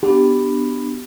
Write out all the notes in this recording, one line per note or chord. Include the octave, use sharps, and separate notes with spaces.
B3 D4 F#4 G4